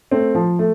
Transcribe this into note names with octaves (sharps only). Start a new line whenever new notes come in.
A3 C4
F3
A3